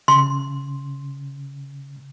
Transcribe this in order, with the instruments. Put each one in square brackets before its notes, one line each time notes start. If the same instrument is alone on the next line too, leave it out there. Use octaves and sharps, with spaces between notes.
[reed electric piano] C#3 [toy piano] C6